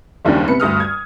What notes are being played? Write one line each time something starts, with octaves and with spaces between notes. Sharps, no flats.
F#1 D#2 G3 C#4 D4
C3 B3 B5 C#7
D2 G2 D#6 F6
G#6